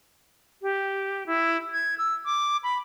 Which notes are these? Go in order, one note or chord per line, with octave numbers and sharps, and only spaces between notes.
G4
E4
G#6
E6
D6
B5